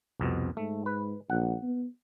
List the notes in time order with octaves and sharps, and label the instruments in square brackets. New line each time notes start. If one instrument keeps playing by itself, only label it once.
[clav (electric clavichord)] C2 F2 B2
[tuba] G#2 [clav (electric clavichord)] A3
[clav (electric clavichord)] B4
[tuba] A#1 [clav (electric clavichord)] F#5
[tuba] B3